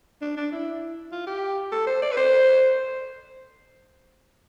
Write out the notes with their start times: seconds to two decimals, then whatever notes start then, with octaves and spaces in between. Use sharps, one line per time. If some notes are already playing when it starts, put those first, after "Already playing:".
0.22 D4
0.37 D4
0.52 E4
1.12 F4
1.27 G4
1.72 A4
1.87 C5
2.02 D5
2.12 B4
2.17 C5